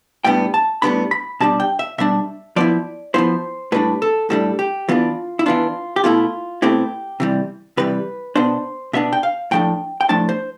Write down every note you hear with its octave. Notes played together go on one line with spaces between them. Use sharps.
A2 G3 B3 D4 G5
A5
A2 G3 B3 D4 B5
B5
B2 G3 D4 A5
G5
E5
B2 G3 D4 E5
F3 B3 E4 D5
F3 B3 E4 C5
A2 G3 D4 B4
A4
A2 G3 D4 A4
G4
E3 B3 D4 F4
E4
E3 B3 D4 F4
G4
B2 A3 C4 E4 F4
B2 A3 C4 E4 G4
C3 E3 G3
C3 E3 G3 B4
B2 B3 D4 C5
B2 B3 D4 E5
G5
F5
A2 F3 A3 D4 G5
G5
A2 F3 A3 D4 A5
C5